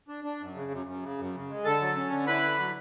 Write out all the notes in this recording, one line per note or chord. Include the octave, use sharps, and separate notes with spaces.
D4
D4
F#2
C#3
F#2
F#2
C#3
F#2
C#3
G#3
D3 A4 A5
F#3
C#4
D3
E4 B4 B5
D3
F#3